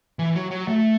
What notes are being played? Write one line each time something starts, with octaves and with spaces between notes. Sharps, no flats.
E3
F#3
F#3
A3